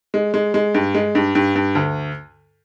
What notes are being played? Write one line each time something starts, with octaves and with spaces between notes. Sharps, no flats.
G#3
G#3
G#3
G2
G#3
G2
G2
G2
D2